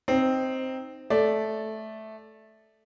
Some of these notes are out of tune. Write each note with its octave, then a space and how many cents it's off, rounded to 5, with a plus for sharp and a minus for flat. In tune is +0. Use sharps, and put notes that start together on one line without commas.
C4 +0 D#4 +0
A3 -10 D5 +0